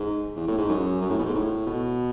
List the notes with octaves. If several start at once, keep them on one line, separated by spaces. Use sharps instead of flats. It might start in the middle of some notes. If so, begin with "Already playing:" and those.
Already playing: G#2
E2
A2
G#2
F#2
F#2
A2
B2
G#2
A2
B2